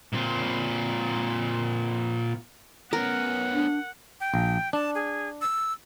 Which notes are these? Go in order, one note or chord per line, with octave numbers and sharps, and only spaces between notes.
A#2 C4
B3 C#4 A#4 F#5
D4
G5
A#1
D4 A5
G#4
E6